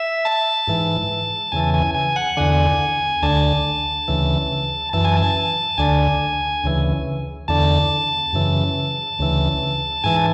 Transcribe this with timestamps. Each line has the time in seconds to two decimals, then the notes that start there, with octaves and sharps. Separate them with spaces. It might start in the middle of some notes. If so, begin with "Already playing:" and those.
Already playing: E5
0.25 A5
0.67 G#2 E3
1.52 E2 C#3 E3 G#5
1.74 G#5
1.95 G#5
2.16 F#5
2.37 E2 D3 G#5
3.22 D2 D3 A5
4.08 D2 C#3 E3
4.93 F#2 E3 A5
5.04 G#5
5.17 A5
5.78 D2 D3 G#5
6.64 D2 C#3 E3
7.48 E2 D3 A5
8.33 F#2 C#3 E3
9.19 D2 C#3 E3
10.04 G#2 E3 G#5